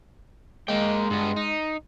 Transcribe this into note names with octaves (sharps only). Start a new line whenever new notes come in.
G#3 A#3 G5
G2 B3
D#4